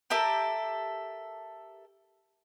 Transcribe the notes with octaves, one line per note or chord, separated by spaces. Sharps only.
G4 A4 A#4 E5